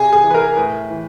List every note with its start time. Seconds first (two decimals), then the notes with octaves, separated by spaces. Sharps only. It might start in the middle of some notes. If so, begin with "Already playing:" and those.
Already playing: C3 G#4
0.13 G#4
0.24 E3
0.30 B4
0.34 A#4
0.56 A2 B4
0.90 E3